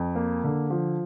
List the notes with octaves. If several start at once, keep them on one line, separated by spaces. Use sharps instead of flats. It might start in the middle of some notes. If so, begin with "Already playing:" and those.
Already playing: F2
A#3
D3
F3